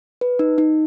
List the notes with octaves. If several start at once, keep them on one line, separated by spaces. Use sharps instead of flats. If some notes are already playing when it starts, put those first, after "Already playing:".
B4
D#4
D#4